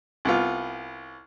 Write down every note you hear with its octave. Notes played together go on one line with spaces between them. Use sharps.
C2 B3 F4